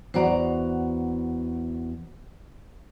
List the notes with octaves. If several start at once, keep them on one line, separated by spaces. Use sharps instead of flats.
E2 F#4 C5 D5 F#5 A#5